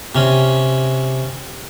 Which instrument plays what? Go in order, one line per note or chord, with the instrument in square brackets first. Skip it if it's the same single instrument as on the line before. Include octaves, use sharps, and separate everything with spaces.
[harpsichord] C3 C#4